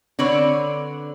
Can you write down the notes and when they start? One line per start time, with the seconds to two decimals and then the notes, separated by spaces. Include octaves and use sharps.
0.19 D3 C4 B4 C#5 D5